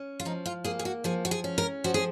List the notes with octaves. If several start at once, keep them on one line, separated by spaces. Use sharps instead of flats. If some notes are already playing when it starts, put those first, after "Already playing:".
Already playing: C#4
F4
F3 D#4
F4
A#3 G#4
G#4
F#4
F3 G#4
F#4
G#4
C#4
A#4
F3 F#4
G#4